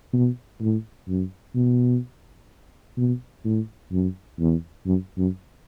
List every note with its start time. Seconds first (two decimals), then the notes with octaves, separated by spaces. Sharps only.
0.13 B2
0.61 A2
1.08 F#2
1.55 B2
2.97 B2
3.45 A2
3.92 F#2
4.39 E2
4.86 F#2
5.18 F#2